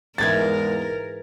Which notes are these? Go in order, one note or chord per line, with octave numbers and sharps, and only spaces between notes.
E2 G#2 E3 G#3 A#3 A#4 G#6 A6